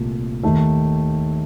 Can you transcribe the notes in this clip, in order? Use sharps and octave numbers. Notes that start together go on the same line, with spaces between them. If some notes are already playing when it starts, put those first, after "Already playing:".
Already playing: C2 A#2 A3
D#2 D#3 A3